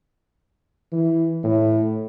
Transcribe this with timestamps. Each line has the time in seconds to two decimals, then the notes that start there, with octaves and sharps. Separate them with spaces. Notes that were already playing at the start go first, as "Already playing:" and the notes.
0.93 E3
1.44 A2